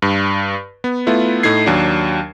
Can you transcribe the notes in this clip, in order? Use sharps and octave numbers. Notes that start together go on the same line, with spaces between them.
G2
B3
A3 B3 E4 F4
A2 A3 D#4 G#6 C7
D#2 F#3 D4